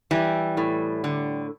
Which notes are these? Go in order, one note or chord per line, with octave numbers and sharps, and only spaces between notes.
E3 G3
A2
D3